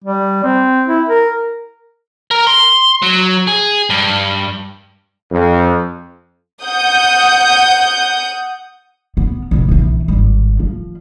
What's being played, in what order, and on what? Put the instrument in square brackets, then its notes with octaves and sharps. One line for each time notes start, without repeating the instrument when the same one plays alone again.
[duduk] G3
C4
E4
A#4
[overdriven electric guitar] A#4
C6
F#3
G#4
G2
[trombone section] F2
[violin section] F#5 D#6 G6
[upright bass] B3
F1 A#1
A#1 E3
G#1 G3
F3